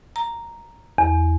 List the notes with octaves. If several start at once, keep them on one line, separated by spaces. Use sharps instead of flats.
A#5
E2